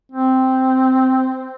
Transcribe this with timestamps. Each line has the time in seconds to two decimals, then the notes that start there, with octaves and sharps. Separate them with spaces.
0.12 C4